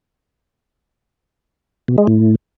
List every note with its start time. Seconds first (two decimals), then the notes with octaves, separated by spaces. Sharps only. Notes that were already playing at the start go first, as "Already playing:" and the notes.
1.88 B2
1.98 G#3
2.07 A2